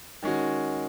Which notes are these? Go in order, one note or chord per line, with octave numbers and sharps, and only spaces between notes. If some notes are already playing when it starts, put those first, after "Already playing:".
D#3 G#3 C#4 F#4